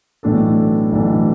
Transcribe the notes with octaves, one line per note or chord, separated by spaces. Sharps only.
B1 A2 E3 D4 A4
B1 A2 E3 D4 A4